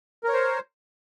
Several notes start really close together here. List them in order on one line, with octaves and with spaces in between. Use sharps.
A#4 C#5 C5